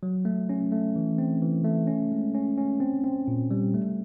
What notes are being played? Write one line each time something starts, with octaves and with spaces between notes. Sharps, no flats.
F#3
A3
C#4
A3
E3
C4
E3
A3
C#4
G#3
C#4
C#4
C4
C4
A#2
G3
A3